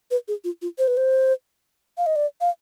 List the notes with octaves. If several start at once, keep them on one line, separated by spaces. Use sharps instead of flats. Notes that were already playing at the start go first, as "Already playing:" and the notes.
B4
G#4
F4
F4
C5
B4
C5
F5
D#5
D5
F5